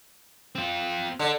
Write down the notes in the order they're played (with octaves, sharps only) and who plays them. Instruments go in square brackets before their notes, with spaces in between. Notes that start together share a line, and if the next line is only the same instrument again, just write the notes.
[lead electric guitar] C4 F4
[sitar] D3